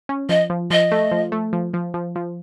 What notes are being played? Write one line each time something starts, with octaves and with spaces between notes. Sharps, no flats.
C#4
F3 D#5
F3
F3 D#5
A3
F3
A3
F3
F3
F3
F3